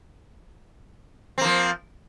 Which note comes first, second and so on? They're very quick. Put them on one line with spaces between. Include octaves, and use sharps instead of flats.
C4 A#3 F3